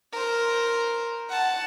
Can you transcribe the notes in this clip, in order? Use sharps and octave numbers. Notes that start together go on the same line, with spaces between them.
A#4 C5
F#5 A5